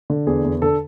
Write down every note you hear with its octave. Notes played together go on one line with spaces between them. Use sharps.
D3
E2 G#4
E2
D3 A4